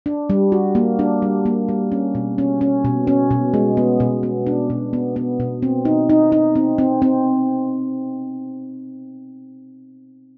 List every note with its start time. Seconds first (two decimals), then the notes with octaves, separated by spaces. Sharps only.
0.06 D4
0.30 G3
0.52 F#4
0.75 A#3
0.99 D4
1.22 G3
1.46 A#3
1.69 G3
1.92 C#4
2.15 B2
2.38 C#4
2.61 C#4
2.85 B2
3.07 C#4
3.31 B2
3.54 G#3
3.77 B3
4.00 B2
4.23 B3
4.47 D4
4.70 B2
4.93 B3
5.16 B3
5.40 B2
5.62 C4
5.85 D#4
6.09 D#4
6.32 D#4
6.55 C4
6.78 C4
7.02 C4